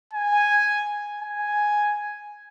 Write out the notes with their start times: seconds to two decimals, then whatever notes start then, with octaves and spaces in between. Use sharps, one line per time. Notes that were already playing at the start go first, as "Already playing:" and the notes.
0.13 G#5
1.21 G#5